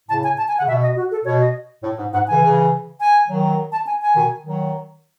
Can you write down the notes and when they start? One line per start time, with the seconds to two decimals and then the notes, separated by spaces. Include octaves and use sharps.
0.09 A2 C#3 A5
0.24 G#5
0.38 A5
0.48 G#5
0.58 F#5
0.61 C#3
0.67 B2 E5
0.82 D#5
0.96 F#4
1.11 A4
1.25 B2 C#5
1.40 D#5
1.83 A2
1.98 G#2
2.13 G#2 F#5
2.28 C#3 E3 G#5
2.42 C#3 E3
3.00 G#5
3.29 D#3 F#3
3.72 A5
3.87 G#5
4.02 G#5
4.16 B2 D#3
4.44 D#3 F#3